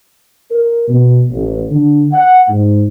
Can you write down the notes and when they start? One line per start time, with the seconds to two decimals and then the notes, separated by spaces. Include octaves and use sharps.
0.51 A#4
0.88 B2
1.30 A1
1.71 D3
2.13 F#5
2.48 G#2